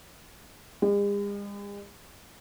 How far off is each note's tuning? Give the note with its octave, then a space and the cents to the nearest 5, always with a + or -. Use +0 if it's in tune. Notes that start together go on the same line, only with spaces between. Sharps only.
G#3 -45